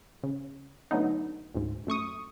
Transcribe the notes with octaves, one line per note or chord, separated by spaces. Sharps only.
C#3
D3 F#3 A3 B3 D#4
D2 G#2
F#2 A3 C#6 D#6